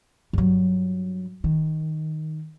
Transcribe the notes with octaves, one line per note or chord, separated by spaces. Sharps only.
G2 F#3
D#3